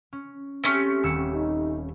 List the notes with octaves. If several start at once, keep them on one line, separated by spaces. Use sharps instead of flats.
C#4
A3 C4 C#4 G4
D#1 G4 E6 C#7
D#4